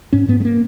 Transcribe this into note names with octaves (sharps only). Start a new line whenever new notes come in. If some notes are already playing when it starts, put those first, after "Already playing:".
G#2 C#4
G#2 B3
G#3
A#3